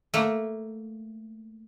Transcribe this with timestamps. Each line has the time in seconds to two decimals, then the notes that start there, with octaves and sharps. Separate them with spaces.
0.14 A3 A#3